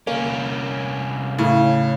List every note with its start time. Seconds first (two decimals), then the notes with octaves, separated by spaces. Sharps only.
0.07 C2 A#3 C#4
1.38 A2 C#3